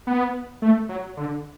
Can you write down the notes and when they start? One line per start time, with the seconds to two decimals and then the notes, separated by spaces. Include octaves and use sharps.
0.07 B3
0.62 A3
0.89 F#3
1.17 D3